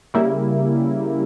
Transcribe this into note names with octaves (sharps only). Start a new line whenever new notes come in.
C#3 G3 A#3 E4